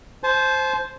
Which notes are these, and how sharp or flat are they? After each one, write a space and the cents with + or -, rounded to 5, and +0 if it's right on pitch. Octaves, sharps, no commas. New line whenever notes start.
C5 +0 A5 -40